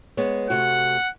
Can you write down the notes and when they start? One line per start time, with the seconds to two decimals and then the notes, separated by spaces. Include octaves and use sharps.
0.17 G#3 B3 C#5
0.50 C3 A3 F#4 F#5